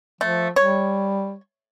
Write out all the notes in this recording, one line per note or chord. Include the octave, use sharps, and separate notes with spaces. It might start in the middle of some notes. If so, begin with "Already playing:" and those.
F3 A3
G3 C#5